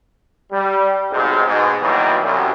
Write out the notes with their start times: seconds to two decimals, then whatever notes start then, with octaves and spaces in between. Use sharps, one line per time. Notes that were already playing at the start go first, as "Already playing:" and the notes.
0.51 G3
1.12 B1 G#2 C3
1.46 G#2 B2
1.82 B2 D#3 E3 F#3 G3 A#3
2.22 C2 F#2